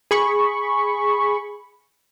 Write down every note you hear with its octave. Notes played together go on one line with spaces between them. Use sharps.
G#4 B5 C#6